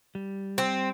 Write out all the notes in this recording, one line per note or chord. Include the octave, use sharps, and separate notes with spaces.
G3
C4